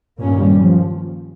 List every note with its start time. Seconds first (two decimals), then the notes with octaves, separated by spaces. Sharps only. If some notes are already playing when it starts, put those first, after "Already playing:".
0.19 G2 A#2 D#3 A#3 C#4
0.41 G3
0.61 F3